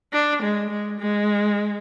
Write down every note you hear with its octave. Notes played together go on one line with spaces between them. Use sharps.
D4
G#3
G#3
G#3